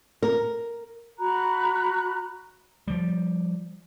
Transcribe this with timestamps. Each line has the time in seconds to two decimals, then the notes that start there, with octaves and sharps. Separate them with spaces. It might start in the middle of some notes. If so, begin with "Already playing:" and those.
0.23 A#4
1.18 F#4 A#5 B5 F#6
2.88 F3 G3